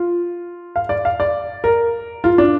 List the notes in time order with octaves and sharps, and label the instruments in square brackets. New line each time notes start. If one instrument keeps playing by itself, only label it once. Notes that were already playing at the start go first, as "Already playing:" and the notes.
Already playing: [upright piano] F4
F5
D5
F5
D5
A#4
F4
D4